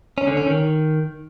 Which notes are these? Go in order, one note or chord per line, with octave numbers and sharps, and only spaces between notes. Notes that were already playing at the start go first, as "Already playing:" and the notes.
C#4
D3
C#4
D#3